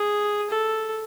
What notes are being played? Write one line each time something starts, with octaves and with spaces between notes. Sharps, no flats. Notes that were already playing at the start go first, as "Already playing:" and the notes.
Already playing: G#4
A4